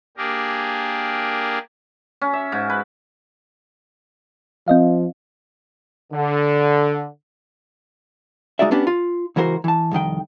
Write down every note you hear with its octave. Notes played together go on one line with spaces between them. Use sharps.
A#3 D4 G4 G#4 A#4
C#4
E5
G#2
B4
F3 C4 D#5 F5
D3
G#3 D#4 F#4 D5 E5
B3 C#4 D4 G4
F4
C#2 E3 F#4 A#4 C5
E3 A5
C2 F2 D#3 G5